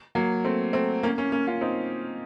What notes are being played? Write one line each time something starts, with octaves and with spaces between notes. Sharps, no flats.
F#3 A#3
A3 C4
A3 C4
A#3 C#4
A#3 C#4
A#3 C#4
C#4 F4
C4 D#4